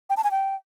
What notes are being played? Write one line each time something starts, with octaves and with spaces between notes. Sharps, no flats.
G5
A5
G#5
G5